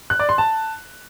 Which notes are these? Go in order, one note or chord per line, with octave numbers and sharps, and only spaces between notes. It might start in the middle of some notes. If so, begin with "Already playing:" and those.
F#6
D5
C6
A5